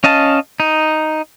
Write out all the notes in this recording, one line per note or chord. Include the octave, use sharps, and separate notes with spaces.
C#4 D#5 F5 A5
D#4